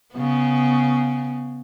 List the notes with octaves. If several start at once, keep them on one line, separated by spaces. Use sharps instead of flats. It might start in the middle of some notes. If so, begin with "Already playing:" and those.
C#3 B3